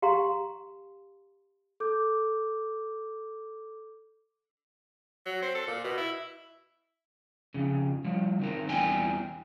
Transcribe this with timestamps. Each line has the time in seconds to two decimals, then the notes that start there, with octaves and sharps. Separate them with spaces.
0.02 G4 F5 A#5 C6
1.80 A4 D6 G6
5.26 F#3
5.42 C4
5.55 A4
5.67 A#2
5.84 B2
5.98 E4
7.54 F2 C#3
8.05 F3 G3
8.40 D#3 C4 A#4
8.69 E2 G3 C4 G5 G#5